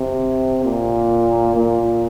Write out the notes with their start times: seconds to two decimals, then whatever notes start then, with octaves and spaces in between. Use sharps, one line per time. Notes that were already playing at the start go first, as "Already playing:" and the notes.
Already playing: C3
0.65 A#2
1.56 A#2